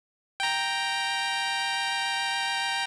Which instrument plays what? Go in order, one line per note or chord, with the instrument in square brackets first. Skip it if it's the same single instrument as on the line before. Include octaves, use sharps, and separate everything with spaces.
[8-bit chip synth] G5 A#5